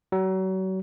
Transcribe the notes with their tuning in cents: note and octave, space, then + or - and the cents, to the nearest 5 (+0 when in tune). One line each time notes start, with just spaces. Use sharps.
F#3 +35